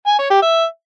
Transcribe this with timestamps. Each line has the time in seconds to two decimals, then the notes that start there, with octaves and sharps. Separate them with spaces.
0.07 G#5
0.19 C#5
0.31 G4
0.42 E5